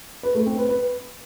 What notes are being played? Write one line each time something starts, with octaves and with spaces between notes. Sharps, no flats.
B4
A3
C4
B4
B4